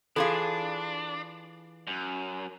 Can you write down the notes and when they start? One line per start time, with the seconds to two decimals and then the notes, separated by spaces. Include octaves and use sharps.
0.16 E3 D4 F4 G#4 A4 F5
1.87 F#2